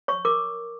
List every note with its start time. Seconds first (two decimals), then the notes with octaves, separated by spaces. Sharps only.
0.08 C#5 C#6
0.25 A#4 D6